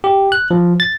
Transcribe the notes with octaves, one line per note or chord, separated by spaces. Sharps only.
G4
F#6
F3
A6